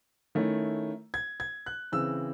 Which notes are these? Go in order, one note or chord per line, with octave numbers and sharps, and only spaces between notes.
D#3 A3 C#4 E4
G#6
G#6
F#6
C#3 E3 C4 E6